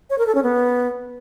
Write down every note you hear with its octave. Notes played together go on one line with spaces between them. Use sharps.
C#5
A#4
A4
C#4
B3